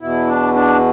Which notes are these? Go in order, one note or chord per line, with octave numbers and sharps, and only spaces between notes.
E2 B2 E4
D4
D4